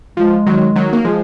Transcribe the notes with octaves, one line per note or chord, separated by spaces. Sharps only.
F3 G#3
D#3 F#3
D#3 F#3
A#3
F3 G#3